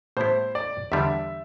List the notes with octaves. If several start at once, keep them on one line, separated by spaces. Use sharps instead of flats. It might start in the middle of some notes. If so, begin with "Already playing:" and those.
A2 G3 B3 E4 C5
D5
E2 D3 G3 D4 E5